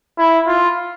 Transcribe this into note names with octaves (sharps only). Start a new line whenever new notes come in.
E4
F4